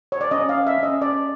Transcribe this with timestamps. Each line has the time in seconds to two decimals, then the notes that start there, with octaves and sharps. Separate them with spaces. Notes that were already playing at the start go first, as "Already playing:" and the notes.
0.12 C#5
0.21 D5
0.31 C#4 D#5
0.49 F5
0.55 C#5
0.67 E5
0.78 C#4 D#5
1.01 C#4 D5